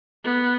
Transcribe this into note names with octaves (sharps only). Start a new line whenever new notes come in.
B3